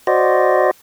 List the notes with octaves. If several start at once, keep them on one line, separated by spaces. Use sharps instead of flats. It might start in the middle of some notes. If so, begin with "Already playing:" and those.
F#4 C5 D5 D#5